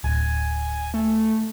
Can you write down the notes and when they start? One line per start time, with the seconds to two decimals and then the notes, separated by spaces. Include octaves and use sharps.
0.04 D1 G#5
0.94 A3